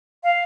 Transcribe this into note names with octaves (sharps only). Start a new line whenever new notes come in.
F5